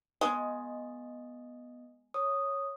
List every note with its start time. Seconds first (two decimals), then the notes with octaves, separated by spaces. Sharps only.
0.21 G#3 B3 D#5
2.14 C#5 D#6